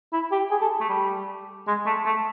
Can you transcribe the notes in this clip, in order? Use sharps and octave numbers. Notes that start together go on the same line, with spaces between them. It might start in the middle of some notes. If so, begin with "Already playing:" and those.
E4
G4
G#4
A4
A3
G3
G#3
A3
A3